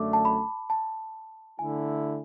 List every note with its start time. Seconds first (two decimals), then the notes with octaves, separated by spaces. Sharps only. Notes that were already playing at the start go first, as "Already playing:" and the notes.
Already playing: F#2 D3 A3 D4 D6
0.13 A5
0.25 B5
0.70 A5
1.58 D3 A3 E4 G#5